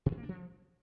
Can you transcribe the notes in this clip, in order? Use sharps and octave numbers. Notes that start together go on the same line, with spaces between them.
B2
G#2
A#3
D4
F3